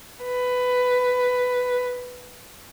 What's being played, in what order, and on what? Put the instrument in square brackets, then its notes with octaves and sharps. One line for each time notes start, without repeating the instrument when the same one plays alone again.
[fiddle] B4